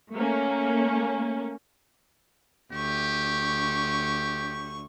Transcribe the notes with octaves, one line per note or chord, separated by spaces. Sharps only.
A3 A#3 C#4
D2 G4 C#6